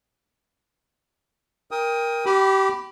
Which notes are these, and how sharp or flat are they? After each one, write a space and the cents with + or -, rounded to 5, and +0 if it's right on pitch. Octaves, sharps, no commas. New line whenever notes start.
A#4 +10 G5 +20 D#6 +20
G4 -25 B5 +0 D6 +0